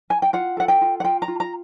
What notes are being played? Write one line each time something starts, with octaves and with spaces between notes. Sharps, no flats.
G#5
G5
F4 F#5
A4 F#5
G5
F4
F#5
F4 G5
A#5
F4
A#5